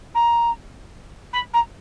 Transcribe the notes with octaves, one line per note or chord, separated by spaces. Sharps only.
A#5
B5
A#5